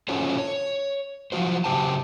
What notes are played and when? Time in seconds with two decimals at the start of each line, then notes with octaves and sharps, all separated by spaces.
0.09 C#4 F4 F#4 A4 C5 C#5
0.38 C#5
1.32 F3 F#3 F4 F#4 C5
1.64 C#3 F#3 G4 C5 G5 A5